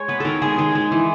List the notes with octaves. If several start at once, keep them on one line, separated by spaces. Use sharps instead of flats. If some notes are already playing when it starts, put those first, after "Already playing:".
Already playing: G#3 C#5
B3 B4
D#3 A4 A#4
G#3 G#4
D#3 G#4
G#3
E3